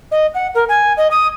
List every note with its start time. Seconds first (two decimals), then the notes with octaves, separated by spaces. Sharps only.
0.11 D#5
0.34 F#5
0.54 A#4
0.68 G#5
0.97 D#5
1.11 D#6